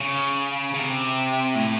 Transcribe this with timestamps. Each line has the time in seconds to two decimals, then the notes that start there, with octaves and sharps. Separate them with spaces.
0.01 C#3
0.74 C#3
0.78 C3
1.55 A2